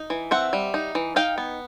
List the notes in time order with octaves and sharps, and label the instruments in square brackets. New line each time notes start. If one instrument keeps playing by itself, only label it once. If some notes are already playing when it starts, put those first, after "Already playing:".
Already playing: [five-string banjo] D#4
E3
C4 E5 F#5
G3
D#4
E3
D#4 F5 G5
B3